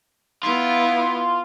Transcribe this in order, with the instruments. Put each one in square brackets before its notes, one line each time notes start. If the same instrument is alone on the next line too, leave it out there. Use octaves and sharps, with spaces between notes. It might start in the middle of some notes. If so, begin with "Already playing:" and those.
[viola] B3 E4 [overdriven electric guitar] F4